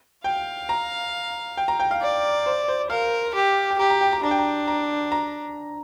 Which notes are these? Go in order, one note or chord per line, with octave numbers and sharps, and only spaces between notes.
F5 G5
A#5
G5
A#5
G5
F5
D5
C5
C5
A#4 F5
G4
G5
G4 A#5
A#5
G5
A#5
D4 A#5
G5
A#5
A#5
A#5